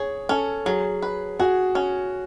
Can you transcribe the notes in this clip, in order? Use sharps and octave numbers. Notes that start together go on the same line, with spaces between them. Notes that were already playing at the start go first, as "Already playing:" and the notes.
Already playing: G#4 C#5
C#4 A4
F#3 G#4
B4
F#4 G#4
C#4